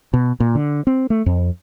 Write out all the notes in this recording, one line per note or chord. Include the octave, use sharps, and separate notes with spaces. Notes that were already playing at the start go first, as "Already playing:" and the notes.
B2
A#2
D3
C4
A3
F2